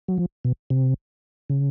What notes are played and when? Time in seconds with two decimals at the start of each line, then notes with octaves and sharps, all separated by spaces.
0.08 F#3
0.18 F3
0.45 B2
0.70 C3
1.50 C#3